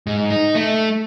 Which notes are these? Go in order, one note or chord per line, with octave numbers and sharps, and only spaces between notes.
G#2
D#4
A3